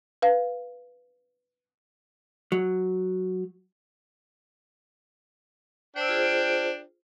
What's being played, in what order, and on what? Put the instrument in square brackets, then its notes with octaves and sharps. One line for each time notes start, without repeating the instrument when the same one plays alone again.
[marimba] B4 F5
[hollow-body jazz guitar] F#3
[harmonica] D4 G5 [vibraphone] C5 E6
[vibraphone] F4 G#4 C5